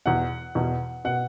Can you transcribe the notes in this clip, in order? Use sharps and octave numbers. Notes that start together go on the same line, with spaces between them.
E2 B2 F#5
E2 B2
B2 F#5